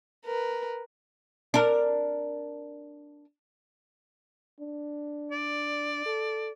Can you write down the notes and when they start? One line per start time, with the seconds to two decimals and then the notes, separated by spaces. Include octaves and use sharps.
0.25 A#4 B4
1.54 D4 A#4
4.60 D4
5.32 D5
6.06 A4